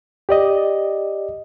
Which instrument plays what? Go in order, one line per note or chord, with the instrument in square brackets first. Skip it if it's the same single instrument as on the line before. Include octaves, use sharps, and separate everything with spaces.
[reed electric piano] G4 D5 D#5